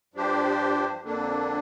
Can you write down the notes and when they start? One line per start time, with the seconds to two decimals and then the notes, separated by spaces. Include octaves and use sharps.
0.14 G2 F3 D4 G4 C5
1.02 F2 D3 A#3 D4